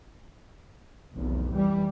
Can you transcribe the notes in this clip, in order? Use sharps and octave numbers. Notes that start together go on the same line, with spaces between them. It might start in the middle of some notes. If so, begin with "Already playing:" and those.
F1 B1 E2
E3 G3